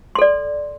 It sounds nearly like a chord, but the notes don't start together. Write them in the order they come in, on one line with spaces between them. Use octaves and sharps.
C6 A4 D5